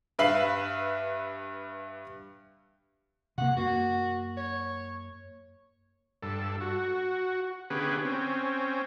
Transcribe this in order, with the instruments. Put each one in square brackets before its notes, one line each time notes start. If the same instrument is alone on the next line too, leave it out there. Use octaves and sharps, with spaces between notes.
[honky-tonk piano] G2 B4 E5 F5 C7 F#7
[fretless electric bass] C3 A#3 [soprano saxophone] F#5
[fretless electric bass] F#2 A#3 [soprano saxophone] F#4
[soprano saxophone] C#5
[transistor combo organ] G2 A4
F#4
D3 B3 C#4 G4 G#4 B4
C4 C#4